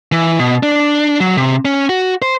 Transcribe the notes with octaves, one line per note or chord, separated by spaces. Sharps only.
E3
B2
D4
F#3
C3
C#4
F#4
C5